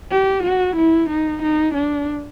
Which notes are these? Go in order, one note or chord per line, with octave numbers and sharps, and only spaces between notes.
G4
F#4
E4
D#4
D#4
D4